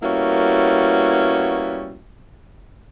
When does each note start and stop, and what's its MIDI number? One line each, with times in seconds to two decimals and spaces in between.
0.02 1.97 55
0.02 1.97 58
0.02 1.97 59
0.02 1.97 61
0.02 1.97 64
0.02 1.97 66